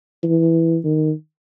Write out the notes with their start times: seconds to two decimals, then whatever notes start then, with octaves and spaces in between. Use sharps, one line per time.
0.23 E3
0.84 D#3